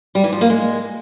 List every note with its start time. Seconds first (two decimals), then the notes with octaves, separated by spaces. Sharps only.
0.15 G3
0.24 E3
0.32 F3
0.41 A#3
0.50 G#3